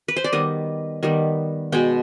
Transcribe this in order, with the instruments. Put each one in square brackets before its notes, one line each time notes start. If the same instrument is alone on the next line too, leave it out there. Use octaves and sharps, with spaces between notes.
[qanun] B4
C5
D5
D#3 G3 B3 D#5
D#3 G3 B3
B2 G#3 B3 G5